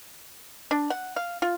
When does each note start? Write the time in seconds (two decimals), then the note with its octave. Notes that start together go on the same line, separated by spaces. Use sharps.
0.71 D4
0.90 F#5
1.16 F5
1.42 F4